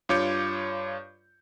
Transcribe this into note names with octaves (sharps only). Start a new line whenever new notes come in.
G2 F4 C#5 D6 G6 C#7